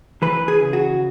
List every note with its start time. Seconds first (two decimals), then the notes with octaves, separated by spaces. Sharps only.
0.22 E3 B4
0.48 G#4
0.61 C#3
0.73 F#4